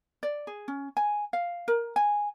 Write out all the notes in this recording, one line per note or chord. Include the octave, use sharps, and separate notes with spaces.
D5
G#4
C#4
G#5
F5
A#4
G#5